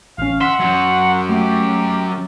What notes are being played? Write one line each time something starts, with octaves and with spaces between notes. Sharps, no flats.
A1 C#4 F5
E5 F#5 C6
F#3 C#4
A3 G4